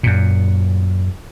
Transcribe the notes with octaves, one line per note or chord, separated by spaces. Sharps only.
F#2 A#2